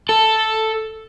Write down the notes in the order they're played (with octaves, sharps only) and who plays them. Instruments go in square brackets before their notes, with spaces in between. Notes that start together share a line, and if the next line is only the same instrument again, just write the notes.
[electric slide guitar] A4